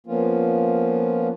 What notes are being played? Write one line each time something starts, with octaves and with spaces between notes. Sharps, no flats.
F3 A#3 B3 C#4 F4